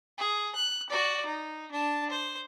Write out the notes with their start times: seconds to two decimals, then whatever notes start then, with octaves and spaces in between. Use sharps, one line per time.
0.18 G#4
0.56 F#6
0.90 F#4 D5
1.26 D#4
1.71 D4 A5
2.10 C5